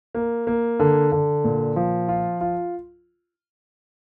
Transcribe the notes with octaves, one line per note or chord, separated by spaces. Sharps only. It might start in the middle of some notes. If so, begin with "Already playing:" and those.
A#3
A#3
D3
D3
A#2
F3
F4
F4